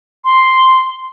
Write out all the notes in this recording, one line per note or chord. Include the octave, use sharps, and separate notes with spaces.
C6